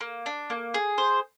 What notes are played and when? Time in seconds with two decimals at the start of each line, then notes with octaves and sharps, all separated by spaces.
0.01 A#3
0.26 D4
0.50 A#3
0.74 G#4
0.98 C5